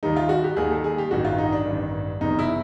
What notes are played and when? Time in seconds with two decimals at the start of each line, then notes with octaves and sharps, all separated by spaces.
0.03 D#2 D#3 G3 A#3 D#4
0.17 F4
0.29 F#4
0.44 G4
0.57 D#2 D#3 G3 A#3 G#4
0.71 A4
0.84 G#4
0.98 G4
1.11 A1 G2 D#3 F#4
1.25 F4
1.38 D#4
1.52 D4
1.65 A1 G2 D#3
2.20 F#1 E2 C3 D#4
2.39 E4